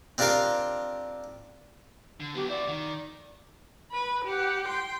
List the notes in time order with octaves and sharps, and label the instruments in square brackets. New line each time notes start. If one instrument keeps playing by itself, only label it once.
[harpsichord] C4 D4 F4 G4 A#4 F5
[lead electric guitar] D3
[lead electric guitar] F#3 B3 [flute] G4
[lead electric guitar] E4 F#4 [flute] D5
[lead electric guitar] D#3
[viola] B4 B5
G4 F#5
G5 C6